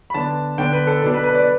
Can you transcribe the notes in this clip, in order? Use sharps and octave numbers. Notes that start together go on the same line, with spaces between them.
B5
D3 B3 D4 A5
D3 B3 D4 G5
B4
A4
B2 B3 D4 A4
B4
B4
D5